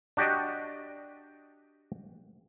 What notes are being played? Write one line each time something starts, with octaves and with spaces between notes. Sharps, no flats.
D4 F#4 G4 D5 D#5